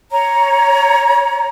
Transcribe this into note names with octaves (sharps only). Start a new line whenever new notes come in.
C#5 A#5